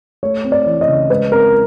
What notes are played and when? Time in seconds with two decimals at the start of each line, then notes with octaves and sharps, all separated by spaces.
0.23 A3 C#5
0.44 C4
0.52 D5
0.66 E3
0.81 D#5
0.88 C#3
1.10 G#3 B4
1.32 C4 A#4